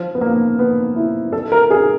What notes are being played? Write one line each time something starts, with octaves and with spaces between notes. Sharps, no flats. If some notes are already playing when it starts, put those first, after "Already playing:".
Already playing: F3
B3
A#3
B3
E4
A4
A#4
G#4